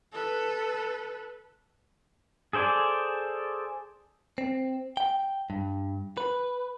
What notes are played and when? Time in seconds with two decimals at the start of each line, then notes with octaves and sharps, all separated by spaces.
0.12 A4 B4
2.53 G#4 A4 C5 D5 G#5
4.38 C4
4.97 G5
5.50 G2
6.17 B4